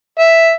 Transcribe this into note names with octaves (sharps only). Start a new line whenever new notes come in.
E5